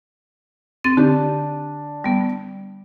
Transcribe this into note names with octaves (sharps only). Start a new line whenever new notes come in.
C4 A6
D3 C4 D4 G4
G3 B3